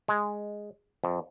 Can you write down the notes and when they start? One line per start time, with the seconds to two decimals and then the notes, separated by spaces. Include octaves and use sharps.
0.08 G#3
1.04 F2